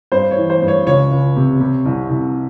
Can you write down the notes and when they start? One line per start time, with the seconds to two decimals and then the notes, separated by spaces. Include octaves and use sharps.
0.12 G2 C5
0.31 C#5
0.37 E3
0.50 C5
0.62 G2
0.68 C#5
0.87 C#2 C#5
1.11 C#2
1.36 C3
1.60 C3
1.86 C2
2.10 C2